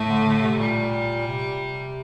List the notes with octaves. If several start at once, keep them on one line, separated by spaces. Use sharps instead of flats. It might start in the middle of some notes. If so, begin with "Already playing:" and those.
Already playing: A2 A3
D3
D3
C3
A#2 G3
C3